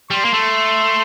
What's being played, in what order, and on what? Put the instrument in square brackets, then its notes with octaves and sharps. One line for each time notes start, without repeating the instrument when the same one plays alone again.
[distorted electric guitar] G3 [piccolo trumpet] C6
[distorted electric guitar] A#3
A3